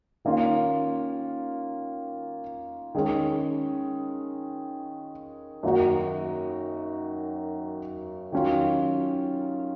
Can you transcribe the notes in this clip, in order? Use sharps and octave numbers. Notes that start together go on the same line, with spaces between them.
D#3 A#3 C#4 F4
D#3 G#3 C#4
F#2 D#3 A#3 D#4 F#4
D#3 F#3 C#4 F4